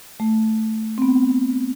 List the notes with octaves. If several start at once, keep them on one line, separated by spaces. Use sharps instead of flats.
A3
C4
B3